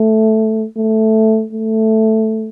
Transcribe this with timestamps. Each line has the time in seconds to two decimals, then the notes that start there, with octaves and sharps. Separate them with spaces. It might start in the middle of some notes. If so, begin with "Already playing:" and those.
Already playing: A3
0.78 A3
1.53 A3